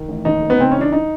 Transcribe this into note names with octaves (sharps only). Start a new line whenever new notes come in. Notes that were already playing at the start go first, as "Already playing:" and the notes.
Already playing: D#3
A1
D#2 D#4
F1
B3
C#3 C4
E3 C#4
D4
D#4